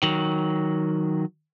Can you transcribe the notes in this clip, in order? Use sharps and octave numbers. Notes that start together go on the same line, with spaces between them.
D#3 F#3